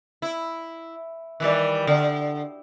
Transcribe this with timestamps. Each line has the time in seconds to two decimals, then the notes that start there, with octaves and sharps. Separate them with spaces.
0.22 E4
1.40 D#3 E3 G3
1.87 D3